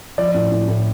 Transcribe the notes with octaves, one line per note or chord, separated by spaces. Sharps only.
F3 D5
A2
A2
A2